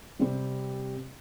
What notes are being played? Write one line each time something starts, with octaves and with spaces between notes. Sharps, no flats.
C3 G3 C4 G4